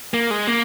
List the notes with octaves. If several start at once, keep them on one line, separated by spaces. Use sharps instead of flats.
A#3
G#3
A#3